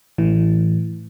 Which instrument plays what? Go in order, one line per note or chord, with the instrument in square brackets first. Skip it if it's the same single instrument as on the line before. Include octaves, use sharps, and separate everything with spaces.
[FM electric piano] A2 E3